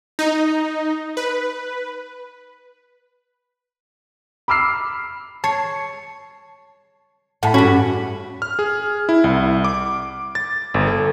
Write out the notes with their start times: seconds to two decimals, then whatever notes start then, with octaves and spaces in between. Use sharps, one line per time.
0.19 D#4
1.17 B4
4.48 B5 D6 E6 F6 C7
5.44 C#5 A5 C7
7.43 A2 F#5 A5 B5
7.54 G2 C#4 F#4 B6
8.42 F6
8.59 G#4
9.09 E4
9.24 C2
9.64 D6
10.35 A6
10.74 G1
10.87 A4